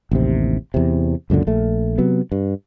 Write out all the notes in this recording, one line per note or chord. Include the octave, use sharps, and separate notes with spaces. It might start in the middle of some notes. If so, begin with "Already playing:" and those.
A1 D#2 C3
E2 C3
C#2 F#2 A#2 D3
A#1 A3
C3 F#3 B3
G2